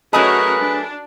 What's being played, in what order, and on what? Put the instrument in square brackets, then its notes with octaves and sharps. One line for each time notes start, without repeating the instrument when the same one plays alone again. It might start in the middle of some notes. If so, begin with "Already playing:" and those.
[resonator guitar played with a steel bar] F#3 A3 D#5 [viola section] C#4 F#4 A#4 [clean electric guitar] G#4 [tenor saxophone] B4
[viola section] D4